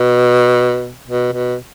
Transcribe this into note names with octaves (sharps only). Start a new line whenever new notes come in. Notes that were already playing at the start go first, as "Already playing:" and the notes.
Already playing: B2
B2
B2